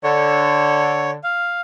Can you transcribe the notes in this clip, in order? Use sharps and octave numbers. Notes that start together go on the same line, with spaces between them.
D3 C#5
F5